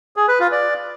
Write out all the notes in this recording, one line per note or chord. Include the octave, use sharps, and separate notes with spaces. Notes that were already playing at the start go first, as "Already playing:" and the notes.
G#4
B4
F4
D5